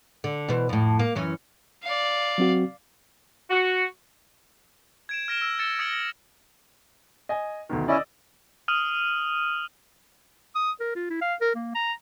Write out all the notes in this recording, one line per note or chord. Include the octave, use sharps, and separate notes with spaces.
D3
B2 E3 C5
F2 A2
A#3
F#2 E3 C#4
D5 F5
F#3 C4 F#4
F#4
G#6 D7 E7
F6 A#6 D7 E7
E6
E6 A6 C#7 E7
D#6 G#6 A#6 C#7 D7 F#7
A#6
D#5 G#5
D2 B2 D#3
C#4 E4 D5 D#5 E6
D#6 F6 D#7 F#7
D#6
A#4
F4
E4
F5
A#4
A#3
A#5